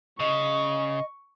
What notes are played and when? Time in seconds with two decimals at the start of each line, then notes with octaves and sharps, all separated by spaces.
0.20 C#3 D#5 C#6